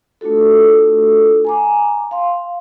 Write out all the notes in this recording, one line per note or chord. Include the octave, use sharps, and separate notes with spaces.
A3 D4 F4 F#4 A4
G#5 A#5 D6
F5 C6